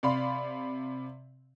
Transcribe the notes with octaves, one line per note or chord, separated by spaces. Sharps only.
C3 D5 F5 B5 C6